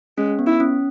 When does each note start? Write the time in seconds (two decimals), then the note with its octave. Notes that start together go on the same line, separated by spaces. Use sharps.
0.18 G#3 C#4
0.39 B3
0.46 E4
0.60 C#4